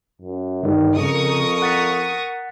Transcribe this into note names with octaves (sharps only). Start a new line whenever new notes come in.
F#2
G2 D3 D#3 G3
F2 C#3 A#4 C#6 D#6
F#5 A6 B6